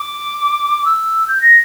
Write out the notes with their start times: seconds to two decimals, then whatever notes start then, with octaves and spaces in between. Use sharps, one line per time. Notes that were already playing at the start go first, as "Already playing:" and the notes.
Already playing: D6
0.85 E6
1.27 G6
1.41 A#6